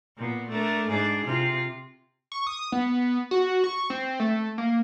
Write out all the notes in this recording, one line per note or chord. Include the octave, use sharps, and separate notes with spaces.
A#2 B3
A3 D4 A#4
G#2 D4 G#4
C3 F4
C#6
D#6
B3
F#4
C#6
C4
A3
A#3